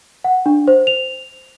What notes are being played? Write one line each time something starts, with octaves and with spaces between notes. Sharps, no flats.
F#5
D4
C5
F7